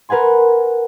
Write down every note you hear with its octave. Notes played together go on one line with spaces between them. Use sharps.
A#4 B4 F#5 G#5 C6